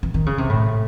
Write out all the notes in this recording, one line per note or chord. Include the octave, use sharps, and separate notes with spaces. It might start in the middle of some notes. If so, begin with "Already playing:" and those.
E3
D#3
C#3
C3
A2